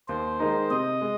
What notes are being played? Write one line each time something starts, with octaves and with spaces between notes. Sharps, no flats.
D#2 C5
D#3 G#3 D#4 A#4
C3 D#5
G#3